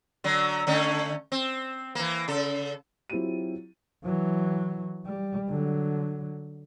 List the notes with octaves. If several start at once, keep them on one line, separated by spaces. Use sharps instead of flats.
D3 F#3
D3 A3 C#4
C4
E3 A#3
C#3 A4
F#3 C4 E4 F4 G4 D#7
E3 F#3
G3
D3 F#3